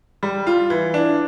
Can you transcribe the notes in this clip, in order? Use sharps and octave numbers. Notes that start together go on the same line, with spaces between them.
G3
F4
E3
D4